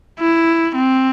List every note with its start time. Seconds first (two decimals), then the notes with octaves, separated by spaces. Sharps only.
0.20 E4
0.75 C4